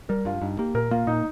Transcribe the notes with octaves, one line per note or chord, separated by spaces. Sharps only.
G3 A#4
G2 F4
G2 D#4
A#3 G4
A#2 A#4
A#3 F4
A#2 D#4